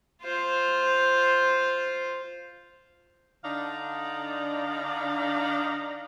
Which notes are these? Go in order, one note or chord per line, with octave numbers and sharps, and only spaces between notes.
F4 C5
D3 D4 D#4 D5 F5